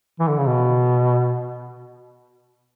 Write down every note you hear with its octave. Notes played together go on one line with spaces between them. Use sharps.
E3
D3
C#3
B2